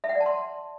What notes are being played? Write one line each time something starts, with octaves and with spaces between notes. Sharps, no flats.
E5
F#5
D5
A5
C6